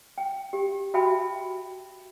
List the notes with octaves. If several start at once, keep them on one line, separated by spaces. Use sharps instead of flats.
G5
G4
F#4 E5 G5 A5 B5